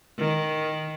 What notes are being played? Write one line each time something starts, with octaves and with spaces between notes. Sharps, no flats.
D#3